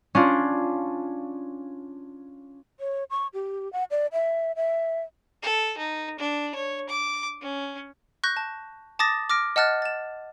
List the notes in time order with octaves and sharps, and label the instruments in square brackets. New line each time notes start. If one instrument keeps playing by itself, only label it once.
[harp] C#4 D4 F4
[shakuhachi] C#5
C#6
G4
F#5
D5
E5
E5
[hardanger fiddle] A4
D#4
D4
C#5
D6
C#4
[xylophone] C#6 F#6 G6 A#6
A5
A5 D6 D#6 A6 A#6
D6 F6 A#6 D7
D#5 F#5 A5 F6 F#6 A6
A6 E7